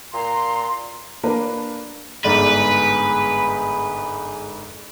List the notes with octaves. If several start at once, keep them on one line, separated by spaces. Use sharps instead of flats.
A#2 A#5 C6
A#3 D4 A#4 B4
G1 G#2 G#4 B4 D5